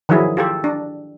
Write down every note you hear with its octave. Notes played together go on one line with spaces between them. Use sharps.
D#3 F3 F#3 E4 G#4
F4 G4 A4
D4